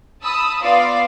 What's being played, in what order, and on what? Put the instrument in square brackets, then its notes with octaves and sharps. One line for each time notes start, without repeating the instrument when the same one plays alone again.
[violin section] A5 B5 D#6 E6
B3 F4 D5 F5